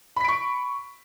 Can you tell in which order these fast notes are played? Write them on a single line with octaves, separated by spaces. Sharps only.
B5 B6 D7 C#6